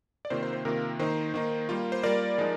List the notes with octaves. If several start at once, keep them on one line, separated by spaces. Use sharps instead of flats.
D5
C3 D#3 A#3 F4 C5
C5
C5
C3 D#3 A#3 F4 A#4
D#3 A#3 D#4 C5
D#3 A#3 D#4
G3 A#3 F4
C5
G3 A#3 F4 A#4 D5
F3 G#3 D#4